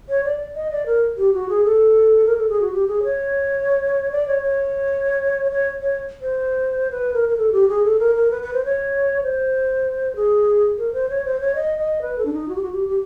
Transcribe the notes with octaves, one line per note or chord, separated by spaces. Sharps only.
C#5
D5
D#5
D5
A#4
G4
F#4
G#4
A4
A#4
A4
G#4
F#4
G4
G#4
C#5
D5
C#5
C#5
C#5
C#5
C5
B4
A#4
A#4
A4
G4
G#4
A4
A#4
A#4
B4
B4
C5
C#5
C5
G#4
A#4
C5
C#5
C5
C#5
D#5
D#5
B4
A4
D4
D#4
F#4
G4
F#4
G4
G4